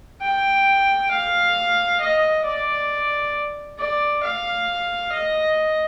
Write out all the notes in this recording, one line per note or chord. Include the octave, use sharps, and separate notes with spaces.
G5
F5
D#5
D5
D5
F5
D#5